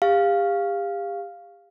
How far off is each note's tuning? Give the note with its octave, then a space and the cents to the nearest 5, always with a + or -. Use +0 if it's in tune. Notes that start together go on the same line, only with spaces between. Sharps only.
G4 +40 F5 +0